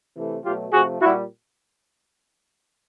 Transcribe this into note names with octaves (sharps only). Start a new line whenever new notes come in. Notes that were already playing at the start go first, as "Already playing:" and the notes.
C3 E3 A3
B2 F#3 A3 F4 G4
C3 F3 A3 F#4 G#4
A#2 G3 E4 F#4